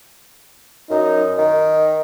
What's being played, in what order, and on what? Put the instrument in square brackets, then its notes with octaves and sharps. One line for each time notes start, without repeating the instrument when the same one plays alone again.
[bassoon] F#2 [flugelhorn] D#4
[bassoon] D#3 [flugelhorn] D#4